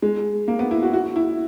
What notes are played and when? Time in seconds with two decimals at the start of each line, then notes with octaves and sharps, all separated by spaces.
0.02 G#3
0.48 A#3
0.59 B3
0.71 E4
0.83 F#4
0.93 F#4
1.16 E4